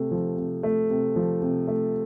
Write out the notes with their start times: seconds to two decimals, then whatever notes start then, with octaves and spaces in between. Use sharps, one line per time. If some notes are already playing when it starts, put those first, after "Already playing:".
Already playing: C3 A3
0.11 F3
0.37 C3
0.63 A3
0.90 C3
1.16 F3
1.42 C3
1.67 A3